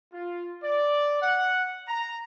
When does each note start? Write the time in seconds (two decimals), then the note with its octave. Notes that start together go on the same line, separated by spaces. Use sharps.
0.13 F4
0.64 D5
1.22 F#5
1.88 A#5